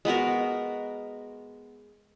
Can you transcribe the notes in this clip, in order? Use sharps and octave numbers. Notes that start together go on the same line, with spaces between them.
G#3 B3 F#4 A#4